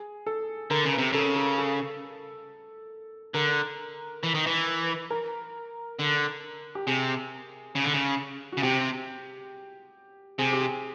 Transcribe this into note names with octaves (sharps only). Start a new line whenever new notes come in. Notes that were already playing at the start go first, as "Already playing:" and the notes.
Already playing: G#4
A4
D3 A#4
C#3
B4
C3
C#3 A4
A4
A4
D3 A#4
E3
D#3
E3
A#4
D3
G4
C3 G#4
C#3
D3
C#3
C#3 F#4
C3 G4
C3 G#4
G4
G#4